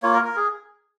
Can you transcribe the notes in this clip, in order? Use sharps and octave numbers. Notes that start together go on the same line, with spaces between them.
A#3 F4 C#5
A#4
A#4
G#4